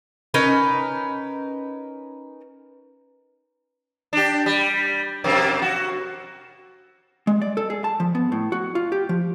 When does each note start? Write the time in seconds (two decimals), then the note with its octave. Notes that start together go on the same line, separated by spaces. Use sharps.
0.34 C#4 D#4 A#4 B4
4.13 D4 G4
4.46 G3
5.24 F2 C3 A#3
5.62 F#4
7.27 G#3
7.42 D5
7.57 A4
7.70 G#4
7.84 A5
8.00 F3
8.15 B3
8.32 A2
8.52 F#4
8.75 F4
8.92 G4
9.09 F3